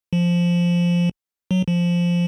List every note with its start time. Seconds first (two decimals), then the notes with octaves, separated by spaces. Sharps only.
0.13 F3
1.51 F#3
1.68 F3